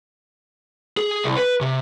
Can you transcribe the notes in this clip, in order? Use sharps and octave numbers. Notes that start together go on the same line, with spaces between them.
G#4
C2
B4
C3